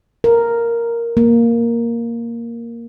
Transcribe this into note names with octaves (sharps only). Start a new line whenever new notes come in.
A#4
A#3